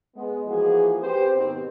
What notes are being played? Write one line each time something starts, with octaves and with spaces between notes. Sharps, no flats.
G#3 B3
E3 F3 G#3 A#3 F#4 G#4
C4 G4 B4 C5
G#2 B2 D#3 C4 G4